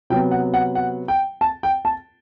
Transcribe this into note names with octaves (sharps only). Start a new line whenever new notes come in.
C3 F#3 B3 G5
F#5
F#5
F#5
G5
A5
G5
A5